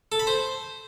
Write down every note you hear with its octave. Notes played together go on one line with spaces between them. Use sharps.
A4
B5
C5